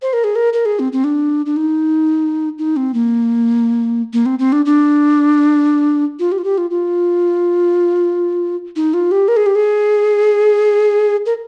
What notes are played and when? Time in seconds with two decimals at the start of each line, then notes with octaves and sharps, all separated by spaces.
0.02 C5
0.13 A#4
0.24 G#4
0.35 A#4
0.53 A#4
0.65 G#4
0.79 C4
0.92 C4
1.04 D4
1.46 D4
1.57 D#4
2.58 D#4
2.76 C4
2.94 A#3
4.13 A#3
4.26 C4
4.39 C4
4.52 D4
4.65 D4
6.19 F4
6.32 G4
6.38 F4
6.44 G4
6.58 F4
6.70 F4
8.76 D#4
8.94 F4
9.11 G4
9.28 A#4
9.37 G#4
9.46 G4
9.55 G#4
11.26 A#4